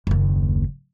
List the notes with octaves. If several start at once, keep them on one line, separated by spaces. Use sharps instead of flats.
F#1 D#2